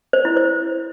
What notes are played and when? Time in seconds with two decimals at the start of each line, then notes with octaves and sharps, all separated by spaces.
0.13 C5
0.25 E4
0.37 C5